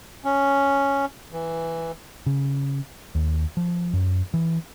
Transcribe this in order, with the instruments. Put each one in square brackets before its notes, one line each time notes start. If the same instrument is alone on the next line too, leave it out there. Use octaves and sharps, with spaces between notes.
[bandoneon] C#4
E3
[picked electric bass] C#3
D#2
F3
F#2
E3